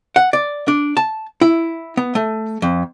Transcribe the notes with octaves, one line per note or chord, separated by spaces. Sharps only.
F#5
D5
D4
A5
E4
B3
A3
F2